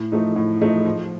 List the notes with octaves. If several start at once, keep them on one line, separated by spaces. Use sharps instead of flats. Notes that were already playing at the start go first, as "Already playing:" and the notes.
Already playing: A2
F3 A3 D#4
A2
F3 A3 D#4
F3